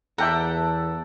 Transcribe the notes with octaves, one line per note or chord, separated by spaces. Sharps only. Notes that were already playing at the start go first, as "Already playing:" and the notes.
E2 A4 E5 F#5 G5 A#5 D6 E6